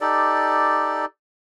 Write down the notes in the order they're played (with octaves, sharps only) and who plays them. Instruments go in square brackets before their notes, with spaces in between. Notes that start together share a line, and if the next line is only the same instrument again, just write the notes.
[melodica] D#4 G4 A4 D5